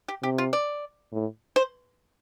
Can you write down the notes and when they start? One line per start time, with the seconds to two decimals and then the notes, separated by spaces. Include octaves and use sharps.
0.08 G4
0.23 C3 G4
0.38 F4
0.53 D5
1.12 A2
1.56 C5